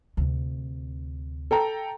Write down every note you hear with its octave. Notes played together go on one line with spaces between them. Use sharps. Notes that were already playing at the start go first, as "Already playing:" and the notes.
D2 C3
A4 G5 A#5